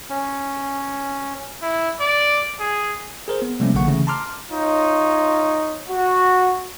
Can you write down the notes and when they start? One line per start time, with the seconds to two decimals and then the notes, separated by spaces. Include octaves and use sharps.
0.10 C#4
1.62 E4
2.00 D5
2.60 G#4
3.28 G#4 A#4 C5
3.42 B3
3.60 C3 F3 G3 A3 A#3 C#4
3.74 A#1 D3 F#3 A#3 F#5 C#6
3.87 C#3 E3 A3 C#4
4.07 A5 A#5 C6 D6 F6
4.50 D#4 F4 C#5
5.88 F#4